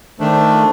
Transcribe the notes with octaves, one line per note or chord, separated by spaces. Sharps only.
D#3 A3 D4 C5
A4
F4